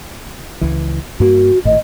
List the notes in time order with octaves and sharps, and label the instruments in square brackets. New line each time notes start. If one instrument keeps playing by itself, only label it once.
[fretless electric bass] C#2 E3
[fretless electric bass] G2 A#3 [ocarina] F#4
[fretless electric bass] G#1 A2 [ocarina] D#5